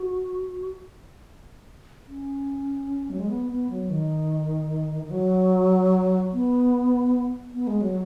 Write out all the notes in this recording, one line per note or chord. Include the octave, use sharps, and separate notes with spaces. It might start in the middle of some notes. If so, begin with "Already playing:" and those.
Already playing: F#4
C#4
F#3
G#3
B3
B3
F#3
D#3
D#3
F#3
B3
B3
G#3
F#3